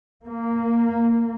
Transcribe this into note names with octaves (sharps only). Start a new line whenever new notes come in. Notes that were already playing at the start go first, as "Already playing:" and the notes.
A#3